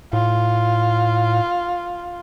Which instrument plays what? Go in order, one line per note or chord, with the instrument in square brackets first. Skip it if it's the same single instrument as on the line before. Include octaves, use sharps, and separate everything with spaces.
[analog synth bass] A2 [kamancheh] F4